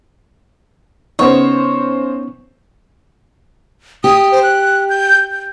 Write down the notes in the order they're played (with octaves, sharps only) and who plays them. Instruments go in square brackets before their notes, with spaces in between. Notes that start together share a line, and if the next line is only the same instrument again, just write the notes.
[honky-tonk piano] C#3 C5 [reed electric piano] B3 C#4 D#4 [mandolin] C#5
[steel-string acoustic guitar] G4 [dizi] D#6
[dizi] C5
F#6
G6
G6